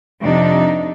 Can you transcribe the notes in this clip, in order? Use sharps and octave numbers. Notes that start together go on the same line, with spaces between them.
F2 C3 D4 D#4